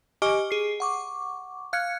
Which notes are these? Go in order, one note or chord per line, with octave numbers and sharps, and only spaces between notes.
G4 D#5 G#5 C#6 D6 F6
G#4 C7
F#5 C#6 D6
F5 F6 F#6 G#6 C#7